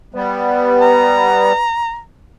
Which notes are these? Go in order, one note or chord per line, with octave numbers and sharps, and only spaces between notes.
G3 B3 B4
A#5